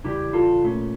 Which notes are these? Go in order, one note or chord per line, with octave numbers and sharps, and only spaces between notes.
E2 C#3 G3 E4 G4
F4 A4
A#2 A3 C#4